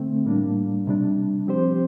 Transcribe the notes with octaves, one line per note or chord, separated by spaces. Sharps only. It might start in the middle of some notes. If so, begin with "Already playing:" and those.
Already playing: D3 A3 C4
A2 G3 A#3 D4
C3 G3 D4
F3 C4 G4 C5